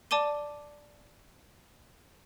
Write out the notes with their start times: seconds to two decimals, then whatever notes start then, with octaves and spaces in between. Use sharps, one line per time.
0.11 D5 A5 D6 D#7 G7